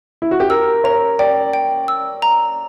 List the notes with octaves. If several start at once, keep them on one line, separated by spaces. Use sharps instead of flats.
E4
F#4
G4
A#4 E6
C#5 A#5
D5 G5
G5
E6
A#5